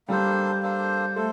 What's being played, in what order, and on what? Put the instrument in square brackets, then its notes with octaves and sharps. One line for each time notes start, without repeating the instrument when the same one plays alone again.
[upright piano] G3 [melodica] A#3 D4 A4 C5
[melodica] A#3 D4 A4 C5
[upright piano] A3 [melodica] A4 C5